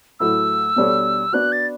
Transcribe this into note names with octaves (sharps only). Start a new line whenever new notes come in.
A2 F#3 A3 E4 E6
B2 G3 D4 A4 C#5
B3 D4 F#4 F#6
A6